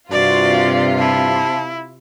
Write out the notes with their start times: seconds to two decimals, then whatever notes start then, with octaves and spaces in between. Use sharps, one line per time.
0.11 G2 C3 F4 F#4 D5
0.99 E4 A5